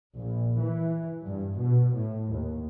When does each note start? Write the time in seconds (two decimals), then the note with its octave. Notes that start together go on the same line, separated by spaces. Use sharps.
0.15 A#1
0.60 E3
1.26 G2
1.58 B2
1.96 A2
2.34 D#2